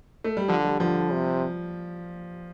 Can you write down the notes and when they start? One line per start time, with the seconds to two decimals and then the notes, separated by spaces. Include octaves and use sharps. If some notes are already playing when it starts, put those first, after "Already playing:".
0.24 A3
0.37 G3
0.48 D3 F3
0.65 G3
0.80 D3 F3
1.12 C3